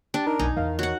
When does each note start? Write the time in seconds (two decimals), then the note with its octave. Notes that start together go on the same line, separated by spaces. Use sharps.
0.14 D4 G4 A6
0.27 D#4 A#4
0.39 B1 F#3 D#4 G#5
0.57 E2 D#3 F5
0.79 F#4 C#5 F#5